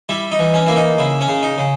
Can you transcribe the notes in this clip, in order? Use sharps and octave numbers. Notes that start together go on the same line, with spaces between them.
G3 E4
D#4
E3
C#4
A#3 E4
D#4
C#3 E4
C#4
C#3
D#4
C#3